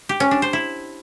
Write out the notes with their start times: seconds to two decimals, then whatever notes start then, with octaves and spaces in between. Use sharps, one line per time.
0.09 G4
0.20 C#4
0.31 D4
0.42 C5
0.53 E4